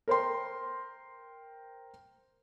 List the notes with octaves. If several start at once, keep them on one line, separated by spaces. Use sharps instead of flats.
A#4 C5 G5 C6